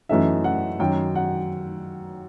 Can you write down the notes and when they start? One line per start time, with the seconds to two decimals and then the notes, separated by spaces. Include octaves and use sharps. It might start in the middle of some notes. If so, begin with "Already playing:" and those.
0.09 F#2 E3 A3 D#4 E5
0.44 F#5
0.80 F#2 D#3 F#3 G5
1.15 F#5